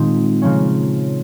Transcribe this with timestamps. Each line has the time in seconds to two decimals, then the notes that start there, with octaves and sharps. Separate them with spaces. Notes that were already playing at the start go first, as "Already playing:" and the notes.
Already playing: A#2 D#3 G#3 C4 D#4
0.42 C#3 F3 A#3 C#4